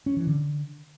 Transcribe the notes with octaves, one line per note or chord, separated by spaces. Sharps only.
C#4
E3
D3